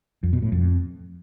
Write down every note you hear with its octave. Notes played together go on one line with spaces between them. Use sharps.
F2
B2
A2
F2